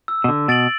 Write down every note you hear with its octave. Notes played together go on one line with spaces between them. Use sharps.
E6
B2
D3
B2 A6 D7 F#7